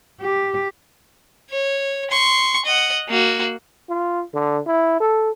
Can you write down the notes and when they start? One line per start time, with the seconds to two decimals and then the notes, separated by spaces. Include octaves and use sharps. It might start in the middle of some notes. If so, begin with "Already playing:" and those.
0.21 G4
1.50 C#5
2.11 C6 C#6
2.65 D#5 F#5
3.09 A#3 F#4
3.89 F4
4.34 D3
4.66 E4
5.00 A4